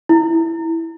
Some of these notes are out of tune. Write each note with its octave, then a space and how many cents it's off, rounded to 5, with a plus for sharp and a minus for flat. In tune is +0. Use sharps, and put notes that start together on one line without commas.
E4 +0